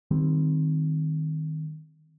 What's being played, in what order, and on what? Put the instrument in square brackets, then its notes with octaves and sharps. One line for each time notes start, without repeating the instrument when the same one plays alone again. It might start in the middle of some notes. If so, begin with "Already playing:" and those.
[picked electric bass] D#3 G3 C4